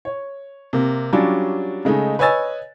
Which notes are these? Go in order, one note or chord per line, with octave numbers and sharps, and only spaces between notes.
C#5
C3 A#3
F#3 G3 C#4 D4 F4
C#3 G#3 A3 D#4
B4 C#5 D#5 G#5 E6 A6